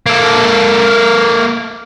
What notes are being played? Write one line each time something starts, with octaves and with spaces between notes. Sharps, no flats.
A#3 A4